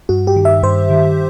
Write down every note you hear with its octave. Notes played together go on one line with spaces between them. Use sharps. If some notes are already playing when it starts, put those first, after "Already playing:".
G2 F#4
G4
D#3
E5
G2 C5
D#3